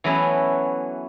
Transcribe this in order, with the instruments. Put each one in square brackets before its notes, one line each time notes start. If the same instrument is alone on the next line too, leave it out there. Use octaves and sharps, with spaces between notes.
[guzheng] E3 F#3 A3 B3 C#4 E4